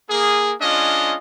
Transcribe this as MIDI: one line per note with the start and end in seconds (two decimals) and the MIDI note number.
0.10 0.54 58
0.10 0.54 68
0.61 1.16 56
0.61 1.16 61
0.61 1.16 62
0.61 1.16 65
0.61 1.16 75